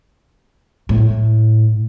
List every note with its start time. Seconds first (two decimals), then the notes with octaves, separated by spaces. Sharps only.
0.89 A2